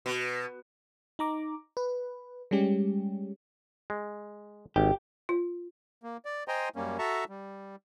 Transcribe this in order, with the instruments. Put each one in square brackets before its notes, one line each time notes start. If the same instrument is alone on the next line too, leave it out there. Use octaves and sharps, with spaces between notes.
[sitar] B2
[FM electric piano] D#4 A#5 D6
B4
G3 G#3 C#4 G4
[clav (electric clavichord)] G#3
[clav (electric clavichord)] G#1 [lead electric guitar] G4
[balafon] F4
[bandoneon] A#3
D5
C5 D#5 G5 G#5 A#5 C6
F#2 G3 A#3 C#4
F#4 A4 E5 A5 A#5 C#6
G3